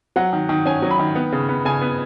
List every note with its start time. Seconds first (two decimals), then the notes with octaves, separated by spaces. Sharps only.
0.16 F#3 F#5
0.33 D#3
0.49 D#3
0.65 C#4 G#5
0.82 F#3
0.91 B5
0.99 D#3
1.15 B3
1.32 C#3
1.49 B3
1.65 C#3 G#5
1.81 B3